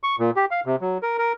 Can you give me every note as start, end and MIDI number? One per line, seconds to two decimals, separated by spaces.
0.03 0.16 85
0.19 0.30 46
0.36 0.45 67
0.51 0.60 77
0.66 0.76 48
0.81 0.98 54
1.03 1.18 70
1.18 1.33 70